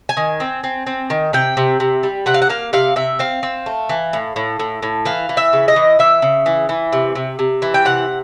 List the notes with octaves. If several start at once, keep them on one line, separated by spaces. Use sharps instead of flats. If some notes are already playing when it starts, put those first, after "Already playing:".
G#5
D#3
C4
C4
C4
D#3
C3 G5
C3
C3
G3
C3 F#5
F5
F#5
A#3 F5
C3 F5
C3 E5
C4 F5
C4
A3
E3
A2
A2
A2
A2
E3 F5
E3
E5
C#3
D#5
E3
E3 E5
C#3
E3
E3
C3
C3
C3
E3
G5
C3 F#5